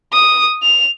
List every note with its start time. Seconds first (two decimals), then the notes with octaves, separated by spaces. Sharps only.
0.13 D#6
0.62 F7